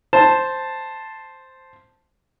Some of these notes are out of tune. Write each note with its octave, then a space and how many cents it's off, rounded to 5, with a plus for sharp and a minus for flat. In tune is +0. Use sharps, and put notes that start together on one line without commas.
C5 +0 A5 +0